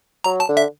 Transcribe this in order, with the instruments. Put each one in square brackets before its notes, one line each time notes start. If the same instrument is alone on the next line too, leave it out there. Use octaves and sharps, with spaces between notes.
[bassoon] F#3 [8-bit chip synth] A#5
[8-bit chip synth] A5
[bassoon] D3
[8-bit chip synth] E5